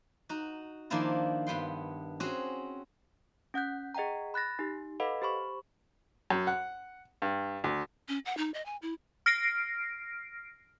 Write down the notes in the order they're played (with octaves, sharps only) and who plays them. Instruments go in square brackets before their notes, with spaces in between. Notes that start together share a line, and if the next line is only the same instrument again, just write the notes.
[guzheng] D#4 F#4
D#3 F3 A#3 D4 E4 F4
G2 B3 G5 C6
C4 C#4 F#4 G#4
[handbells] C#4 F#5 F#6 G6
G#4 D#5 F#5 G5 A#5
B5 F#6 A6 A#6
D#4 G4
A4 B4 D#5 F5 F#5 B5
G4 C5 B5 C#6
[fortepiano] F#2
F#5
G2
D2
[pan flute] C#4
F#5
D#4
D#5
G#5
E4
[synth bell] F6 A#6 C7 D7